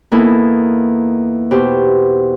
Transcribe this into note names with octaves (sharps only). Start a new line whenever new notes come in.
E2 A#3 D#4 E4 A4
B2 G4 C5